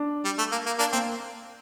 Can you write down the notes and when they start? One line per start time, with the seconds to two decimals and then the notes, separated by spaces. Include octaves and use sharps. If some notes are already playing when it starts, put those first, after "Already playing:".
Already playing: D4
0.25 G3
0.38 A3
0.52 A#3
0.66 A#3
0.79 A#3 D4
0.93 A#3 C4